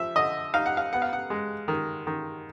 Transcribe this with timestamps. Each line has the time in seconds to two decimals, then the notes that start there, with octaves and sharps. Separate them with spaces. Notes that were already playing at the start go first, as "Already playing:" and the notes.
Already playing: F3 E5
0.16 D3 D#5
0.54 D#4 F5
0.66 F#5
0.77 F5
0.92 B3 F#5
1.02 F5
1.13 F#5
1.30 G#3
1.68 D#3
2.07 D#3